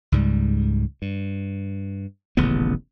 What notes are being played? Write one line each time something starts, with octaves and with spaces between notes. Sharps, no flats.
C#2 G#2 G3
G2
D#1 A1 C#3 B3